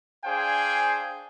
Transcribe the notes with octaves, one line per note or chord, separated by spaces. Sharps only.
D4 G#4 C5 F5 G5 G#5